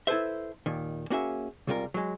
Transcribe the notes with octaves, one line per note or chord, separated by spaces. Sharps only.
E4 A4 B4 C5 E5
D#2 A#2 D#3
A#3 C#4 F#4 G#4 D5 E5
C#2 C3 G3 F4 G4 A#4
F#3 G#3